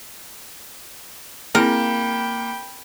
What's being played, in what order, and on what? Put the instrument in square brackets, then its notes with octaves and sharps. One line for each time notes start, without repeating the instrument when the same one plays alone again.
[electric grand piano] A#3 [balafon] C4 E4 G#4 [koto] A#4 [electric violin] G5 B5